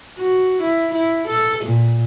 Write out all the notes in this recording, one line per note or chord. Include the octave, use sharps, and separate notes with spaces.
F#4
E4
E4
A4
A#2